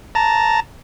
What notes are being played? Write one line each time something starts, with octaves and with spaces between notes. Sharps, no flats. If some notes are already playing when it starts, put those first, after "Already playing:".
A5 A#5